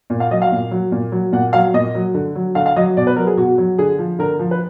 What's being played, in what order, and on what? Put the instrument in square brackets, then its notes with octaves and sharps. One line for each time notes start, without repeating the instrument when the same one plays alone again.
[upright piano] A#2
F5
F#3 D#5
F5
A#2
F#3
A#2
F#3
A#2 F#5
F#3 F5
A#2 D#5
F#3
D3
F#3
D3 F5
F5
F#3 D#5
B2 D5
B4
F#3 A#4
G#4
B2 F#4
F#3
D3 G#4
F3
D3 A#4
F3
B4